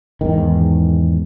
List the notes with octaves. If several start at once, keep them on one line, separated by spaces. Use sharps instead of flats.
E2 G#2 D#3